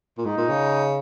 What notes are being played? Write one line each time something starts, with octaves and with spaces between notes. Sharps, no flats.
A#2
G#2 D#4
A#2
C#3